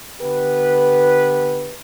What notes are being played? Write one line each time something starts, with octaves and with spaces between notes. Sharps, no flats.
D3 B3 G4 B4